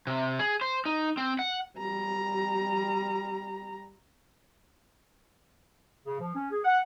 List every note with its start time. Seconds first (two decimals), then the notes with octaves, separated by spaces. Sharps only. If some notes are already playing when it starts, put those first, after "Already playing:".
0.07 C3
0.39 G#4
0.61 C5
0.85 D#4
1.17 C4
1.39 F#5
1.78 G3 A#5
6.06 C#3
6.20 F3
6.35 C#4
6.52 G#4
6.65 F#5